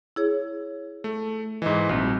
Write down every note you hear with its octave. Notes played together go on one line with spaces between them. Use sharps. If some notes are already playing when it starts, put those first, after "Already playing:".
E4 G#4 C#5
A3
G#2 E3 D#5
A#1 G3 C4 F#4